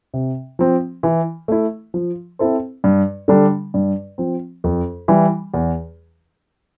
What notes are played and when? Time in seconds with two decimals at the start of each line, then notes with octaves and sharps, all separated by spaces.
0.14 C3
0.59 F3 C4
1.03 E3
1.48 A3 E4
1.94 F3
2.39 C4 E4 A4 C5
2.84 G2
3.28 D3 G3 D4
3.74 G2
4.18 F3 C4
4.64 F2
5.08 E3 G3
5.54 E2